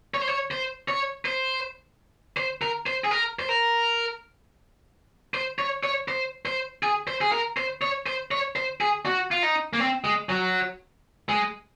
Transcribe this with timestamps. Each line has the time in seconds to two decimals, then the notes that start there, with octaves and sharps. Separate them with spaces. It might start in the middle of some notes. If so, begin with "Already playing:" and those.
0.14 C#5
0.21 C5
0.29 C#5
0.51 C5
0.88 C#5
1.25 C5
2.37 C5
2.62 A#4
2.86 C5
3.04 G#4
3.11 A#4
3.39 C5
3.49 A#4
5.34 C5
5.59 C#5
5.84 C#5
6.08 C5
6.45 C5
6.83 G#4
7.07 C5
7.21 G#4
7.32 A#4
7.57 C5
7.82 C#5
8.06 C5
8.31 C#5
8.56 C5
8.81 G#4
9.06 F#4
9.31 F4
9.43 D#4
9.73 A#3
9.80 C4
10.04 G#3
10.29 F#3
11.29 G#3